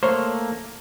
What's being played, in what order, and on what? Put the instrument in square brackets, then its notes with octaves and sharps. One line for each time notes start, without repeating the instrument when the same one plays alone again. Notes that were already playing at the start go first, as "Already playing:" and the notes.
[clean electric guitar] A3 A#3 [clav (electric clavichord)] C5 C#5